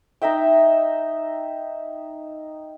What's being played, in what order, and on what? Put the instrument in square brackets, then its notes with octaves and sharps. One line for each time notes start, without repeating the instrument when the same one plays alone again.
[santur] D#4 D#5 E5 G5